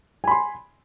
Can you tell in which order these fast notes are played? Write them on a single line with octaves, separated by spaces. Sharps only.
G#5 B5 C6